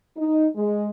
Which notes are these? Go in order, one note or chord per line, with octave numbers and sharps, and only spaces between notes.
D#4
G#3